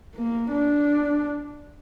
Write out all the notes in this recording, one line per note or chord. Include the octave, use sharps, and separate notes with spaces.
A#3
D4